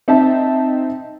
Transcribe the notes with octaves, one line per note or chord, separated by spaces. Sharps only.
C4 D#4 E5 A5